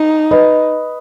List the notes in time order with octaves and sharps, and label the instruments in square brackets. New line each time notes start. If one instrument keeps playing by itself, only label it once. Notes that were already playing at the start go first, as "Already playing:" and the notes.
Already playing: [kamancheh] D#4
[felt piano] B4 D#5